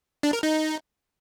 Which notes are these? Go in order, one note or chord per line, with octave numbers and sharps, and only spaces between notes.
D4
A#4
D#4